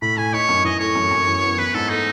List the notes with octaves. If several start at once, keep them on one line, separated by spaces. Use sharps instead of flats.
A2 B5
A2 G#5
D#4 C#5
F#2
E3 D#5
A3 C#5
F#2
F#2
E3
B3
E3 B4
G#2 A4
A3 D#4